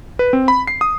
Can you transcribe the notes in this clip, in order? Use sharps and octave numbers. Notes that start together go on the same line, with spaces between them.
B4
C4
B5
C7
D#6